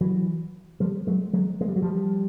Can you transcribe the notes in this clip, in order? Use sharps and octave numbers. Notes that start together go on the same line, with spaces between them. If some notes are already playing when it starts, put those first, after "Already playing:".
E3 F#3
F3 G3
F#3 G#3
F#3 G#3
G#3
G3
F#3
F3 G3